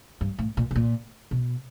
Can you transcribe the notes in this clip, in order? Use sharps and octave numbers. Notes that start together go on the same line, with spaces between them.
G2
A2
A#2
B2
A#2
B2